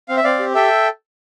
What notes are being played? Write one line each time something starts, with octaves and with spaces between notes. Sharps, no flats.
C4 F5
E5
C4 D5 F5
G4
A4 E5 G5